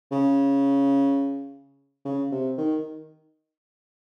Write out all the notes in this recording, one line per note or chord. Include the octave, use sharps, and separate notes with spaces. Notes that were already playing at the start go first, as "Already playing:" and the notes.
C#3
C#3
C3
D#3